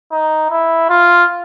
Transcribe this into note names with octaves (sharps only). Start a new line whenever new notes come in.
D#4
E4
F4